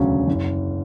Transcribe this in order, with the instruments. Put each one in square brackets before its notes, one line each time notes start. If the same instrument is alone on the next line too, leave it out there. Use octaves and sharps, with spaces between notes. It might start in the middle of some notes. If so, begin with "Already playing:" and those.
Already playing: [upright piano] E1 D2 C#3 F#3 C#4
F#1